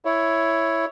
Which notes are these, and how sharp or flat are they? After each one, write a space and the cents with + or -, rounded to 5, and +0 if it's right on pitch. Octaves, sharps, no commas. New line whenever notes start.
E4 +0 C#5 +0